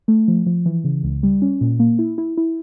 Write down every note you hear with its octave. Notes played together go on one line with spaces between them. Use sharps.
A3
F3
F3
E3
C#3
C#2
G3
C#4
A#2
A#3
E4
E4
E4